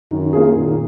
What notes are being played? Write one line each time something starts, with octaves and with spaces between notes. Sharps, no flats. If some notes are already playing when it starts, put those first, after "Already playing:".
F#2 D#3
A#3 F4 G#4
A#2 D#3